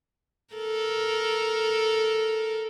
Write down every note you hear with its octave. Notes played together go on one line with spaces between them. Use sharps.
A4 A#4